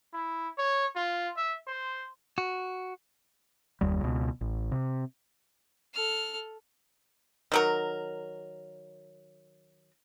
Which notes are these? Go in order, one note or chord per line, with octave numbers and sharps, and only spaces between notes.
E4
C#5
F4
E5
C5
F#4
F#1 D#2 G3
C#2 B2
A1
C3
A4 F6
D#3 F#3 A#4